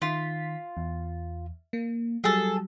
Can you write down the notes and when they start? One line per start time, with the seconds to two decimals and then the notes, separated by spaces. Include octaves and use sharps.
0.02 D#3 F4 C6 B6
0.77 E2
1.73 A#3
2.24 F#3 G3 G#4 A4